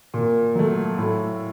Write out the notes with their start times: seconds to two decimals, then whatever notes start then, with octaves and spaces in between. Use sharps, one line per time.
0.14 A#2
0.55 F#3 A3
0.98 A2